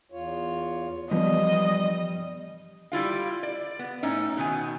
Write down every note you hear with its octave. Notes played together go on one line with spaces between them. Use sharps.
E2 F4 C#5
G2 E3 F3 G3 B3 D#5
G3 E4 F4 F5
D5
B3
A2 C#4 D#4
B2 D#3 G#5